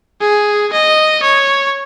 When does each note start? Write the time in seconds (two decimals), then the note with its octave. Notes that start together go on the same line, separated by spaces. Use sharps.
0.21 G#4
0.73 D#5
1.23 C#5